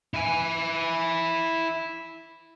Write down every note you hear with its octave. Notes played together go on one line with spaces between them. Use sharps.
E4 G#5